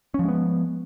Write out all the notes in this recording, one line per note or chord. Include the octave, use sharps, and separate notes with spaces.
F3 G#3 B3 C#4